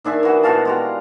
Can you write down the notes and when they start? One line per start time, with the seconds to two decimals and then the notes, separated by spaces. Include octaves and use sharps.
0.04 D#3 D4 G#4 E5
0.23 E3 F#4
0.43 B2 F#4 F5 A5
0.65 G#3 G4 A#5